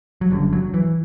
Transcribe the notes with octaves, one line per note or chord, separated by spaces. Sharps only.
F#3
F#1 F#2 D3 G3
F#3
E3